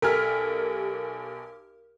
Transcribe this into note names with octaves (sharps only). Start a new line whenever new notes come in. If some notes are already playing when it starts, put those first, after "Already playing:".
B1 G4 A4 A#4 G#5 F6 B6